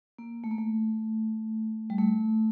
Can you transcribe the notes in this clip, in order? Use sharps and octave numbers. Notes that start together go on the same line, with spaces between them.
A#3
A3
A#3
A3
G3
A3